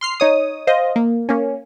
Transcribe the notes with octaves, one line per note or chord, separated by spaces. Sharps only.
C6 F6 C7
D#4 C#5 D#6
C5 D#5 F5
A#3
A#3 C#4